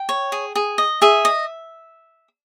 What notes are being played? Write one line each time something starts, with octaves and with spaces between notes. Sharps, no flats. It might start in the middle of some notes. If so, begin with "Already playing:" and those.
Already playing: G5
C#5
G#4
G#4
D#5
G#4 E5
D#5